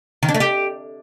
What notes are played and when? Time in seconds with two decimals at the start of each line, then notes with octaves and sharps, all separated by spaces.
0.23 D#3
0.29 D4
0.34 A3
0.40 G4